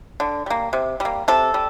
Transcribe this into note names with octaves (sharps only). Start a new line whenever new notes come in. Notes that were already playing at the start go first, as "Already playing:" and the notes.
D3
G3 A#3
C3
G3 A#3
C3 A4
G3